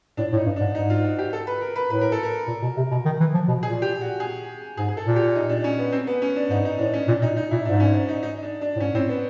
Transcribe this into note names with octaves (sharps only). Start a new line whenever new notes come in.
A2 D4
A2
D#4
G2
D4
G#2
G#2 D#4
F4
F#4
G4
A4
B4
A#4
B4
A2 B4
A#4
A4
A#4
A#2
B2
C3
B2
D#3
E3
F3
B2
A#2 G#4
G4
F#4
G#4
G#2 G#4
G#4
A4
A#2
G4
D#4
D4
C#4
B3
C4
B3
C#4
D4
G#2 D#4
D#4
A2 D4
C#4
A#2 D4
A#2 D#4
D#4
A#2 E4
G#2 D4
C#4
D4
D#4
D#4
D4
D4
A2
G#2 C#4
A2 C4
B3